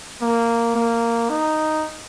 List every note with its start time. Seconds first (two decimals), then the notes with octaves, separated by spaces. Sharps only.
0.21 A#3
0.75 A#3
1.30 D#4